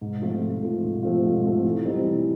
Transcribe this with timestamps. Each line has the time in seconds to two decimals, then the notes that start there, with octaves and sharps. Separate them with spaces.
0.01 G#2
0.22 F3 A3 C4 F4
0.41 G#2
0.62 F3 A3 C4 F4
0.83 G#2
1.03 F3 A3 C4 F4
1.24 G#2
1.44 F3 A3 C4 F4
1.65 E3
1.85 G3 C4 D#4
2.05 E3